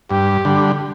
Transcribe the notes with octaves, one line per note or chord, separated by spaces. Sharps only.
G2 G4
D3 G3